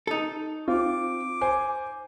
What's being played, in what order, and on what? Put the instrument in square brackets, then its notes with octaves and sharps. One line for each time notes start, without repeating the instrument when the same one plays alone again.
[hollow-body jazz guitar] D#4 A4
[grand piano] C4 F4 [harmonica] D6
[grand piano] C5 G#5 G6